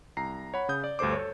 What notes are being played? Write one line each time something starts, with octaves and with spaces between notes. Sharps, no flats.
C2 A#5 C7
C#5 F#5 B5
C#3 D#6 G6
D5
D2 G2 A4 C5 D6
A4 C#5